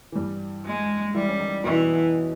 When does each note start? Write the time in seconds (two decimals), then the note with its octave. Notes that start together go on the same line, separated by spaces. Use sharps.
0.12 E3
0.16 G2 G3
0.66 G#3
1.14 E3 G3 E4
1.28 C#4
1.40 D#3 D#4
1.64 B2 E3 B3